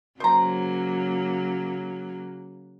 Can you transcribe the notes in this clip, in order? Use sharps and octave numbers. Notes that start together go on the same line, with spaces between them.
C#3 F#3 A#3 C5 A#5